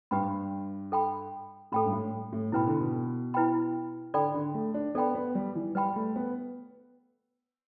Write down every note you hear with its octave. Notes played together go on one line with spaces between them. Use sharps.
G2 G4 B4 G5 B5
A4 G5 B5
A2 A4 G5 B5
G2
A2
A2
B2 E4 B4 G5 B5
D3
B2
E4 B4 G5 B5
D3 A4 D5 G5 B5
D3
A3
D4
B3 A4 D5 G5 B5
B3
G3
E3
G3 B4 G5 B5
A3
B3